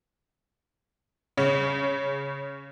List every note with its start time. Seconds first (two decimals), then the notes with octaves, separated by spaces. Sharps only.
1.37 C#3